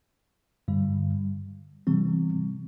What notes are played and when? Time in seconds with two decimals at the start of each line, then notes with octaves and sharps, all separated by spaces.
0.68 G2 D3 G3
1.87 C3 E3 G3 C4